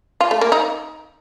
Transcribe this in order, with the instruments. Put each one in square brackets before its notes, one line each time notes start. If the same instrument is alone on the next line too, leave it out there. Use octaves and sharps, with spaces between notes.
[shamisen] F4
A3
A#3
D#4